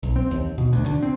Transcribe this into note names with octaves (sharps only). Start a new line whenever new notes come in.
B1
C4
D#2
B2
D2
D3
C4